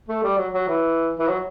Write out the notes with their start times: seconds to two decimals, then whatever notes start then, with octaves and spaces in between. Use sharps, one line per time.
0.09 A3
0.23 G3
0.38 F#3
0.53 F#3
0.68 E3
1.19 E3
1.28 F#3